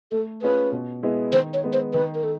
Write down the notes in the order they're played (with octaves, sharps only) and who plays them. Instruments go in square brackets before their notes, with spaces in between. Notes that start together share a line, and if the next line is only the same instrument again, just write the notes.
[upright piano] A3 [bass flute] A4
[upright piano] C#4 F4 G#4 [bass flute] B4
[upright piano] B2
G#3 B3 E4 G#4
[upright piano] D#3 [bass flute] C5
[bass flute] C#5
[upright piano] G#3 B3
[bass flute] C5
[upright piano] D#3 [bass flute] B4
[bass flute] A#4
A4